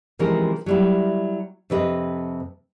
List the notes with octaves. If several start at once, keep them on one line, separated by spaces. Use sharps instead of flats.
C3 E3 F3 G#3 C#4 A#4
F#3 G3 E4
F2 C3 B4 D#5